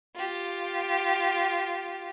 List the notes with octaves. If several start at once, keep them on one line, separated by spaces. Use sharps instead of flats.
F4 G4